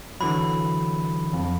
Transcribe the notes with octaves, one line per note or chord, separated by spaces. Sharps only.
D3 E3 F#3 B5
F2